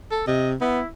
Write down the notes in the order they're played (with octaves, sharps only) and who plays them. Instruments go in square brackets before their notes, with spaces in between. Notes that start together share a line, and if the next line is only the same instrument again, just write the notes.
[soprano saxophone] A4
[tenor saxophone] C3 [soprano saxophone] D#5
[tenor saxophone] B3 [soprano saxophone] E4